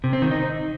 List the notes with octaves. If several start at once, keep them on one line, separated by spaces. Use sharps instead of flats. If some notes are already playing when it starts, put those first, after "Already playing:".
C3
C4
D#3
D#4